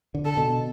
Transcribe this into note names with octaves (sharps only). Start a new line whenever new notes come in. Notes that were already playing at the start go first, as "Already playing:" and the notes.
D3
A4
B2